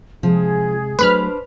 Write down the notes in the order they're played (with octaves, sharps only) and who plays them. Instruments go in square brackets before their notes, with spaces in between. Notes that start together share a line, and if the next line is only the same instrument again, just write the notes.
[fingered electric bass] C3 G#3 [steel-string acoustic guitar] F3 [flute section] G#4
[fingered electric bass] F#3 A3 [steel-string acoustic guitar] D4 C5 [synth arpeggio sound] B4 B5 F6